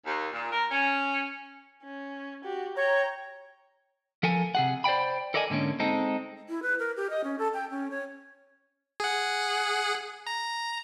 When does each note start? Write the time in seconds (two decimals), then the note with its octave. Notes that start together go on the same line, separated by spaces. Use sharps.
0.06 D#2
0.33 A#2
0.52 A#4
0.71 C#4
1.83 C#4
2.44 F#4 G4
2.77 C#5 G5 A#5
4.23 F3 A4 A#4 G#5
4.55 C3 G#4 F#5
4.84 C5 D5 F5 G5 B5
5.34 A4 A#4 D5 D#5 F5 G#5
5.50 G#2 D3 A#3 C#4
5.80 G#3 C4 D#4 A4
6.49 E4
6.63 B4
6.79 A#4
6.97 G4
7.10 D#5
7.24 C#4
7.39 A4
7.54 G5
7.70 C#4
7.90 C#5
9.00 G#4 F#5
10.27 A#5